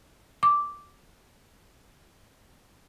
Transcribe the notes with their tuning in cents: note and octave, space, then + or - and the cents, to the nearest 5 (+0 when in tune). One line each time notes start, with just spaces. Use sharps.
D6 -5